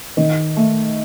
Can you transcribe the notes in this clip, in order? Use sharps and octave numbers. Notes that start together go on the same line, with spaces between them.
D#3
A3